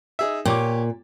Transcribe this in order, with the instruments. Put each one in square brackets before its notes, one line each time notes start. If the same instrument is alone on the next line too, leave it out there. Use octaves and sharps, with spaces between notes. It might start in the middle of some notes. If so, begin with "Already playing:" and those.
[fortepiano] D#4 G#4 E5
[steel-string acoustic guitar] A#2 [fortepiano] G4 C#5 D6